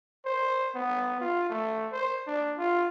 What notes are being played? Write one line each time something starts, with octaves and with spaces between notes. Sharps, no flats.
C5
B3
F4
A3
C5
D4
F4